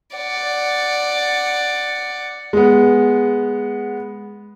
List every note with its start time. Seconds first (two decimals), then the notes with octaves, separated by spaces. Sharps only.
0.16 D5 F#5
2.53 G#3 B3